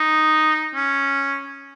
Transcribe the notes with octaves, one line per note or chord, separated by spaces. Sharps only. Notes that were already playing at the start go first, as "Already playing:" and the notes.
Already playing: D#4
C#4